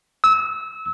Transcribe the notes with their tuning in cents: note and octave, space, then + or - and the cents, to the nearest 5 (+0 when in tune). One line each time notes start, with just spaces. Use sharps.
E6 -30